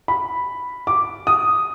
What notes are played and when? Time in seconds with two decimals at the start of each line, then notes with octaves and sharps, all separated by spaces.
0.08 B5
0.87 D6
1.27 D#6